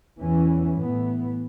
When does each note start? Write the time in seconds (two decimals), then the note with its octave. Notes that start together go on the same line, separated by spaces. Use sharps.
0.21 E2 E3 C#4
0.79 A2 E3 B3